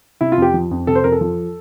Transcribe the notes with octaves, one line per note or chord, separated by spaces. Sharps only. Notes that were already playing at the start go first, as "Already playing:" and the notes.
C3 E4
F4
F2 G4
F3
F2
C3 A4
C5
F2 A#4
A4
F3